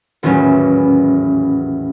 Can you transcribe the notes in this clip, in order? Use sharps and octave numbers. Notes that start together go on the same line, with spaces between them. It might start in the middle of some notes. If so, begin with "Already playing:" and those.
D#1 A1 E2 F#3 C#4